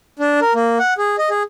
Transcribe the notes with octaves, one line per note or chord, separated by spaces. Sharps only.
D4
A#4
A#3
F#5
G#4
D#5
G#4